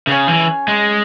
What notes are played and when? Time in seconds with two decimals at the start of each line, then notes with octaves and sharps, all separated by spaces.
0.07 C#3 C#4 G#4 C#5 G#5
0.28 E3
0.68 G#3